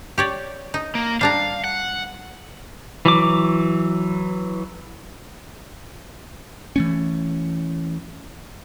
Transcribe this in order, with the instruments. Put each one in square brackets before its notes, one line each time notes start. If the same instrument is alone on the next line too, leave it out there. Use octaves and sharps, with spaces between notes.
[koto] G4 C#5 D5
D#4
[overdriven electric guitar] A#3
[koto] G3 D4 A#5 [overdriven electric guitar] F5
[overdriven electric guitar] F#5
[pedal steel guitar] E3 F#3 D6
[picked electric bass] E3 A3 C#4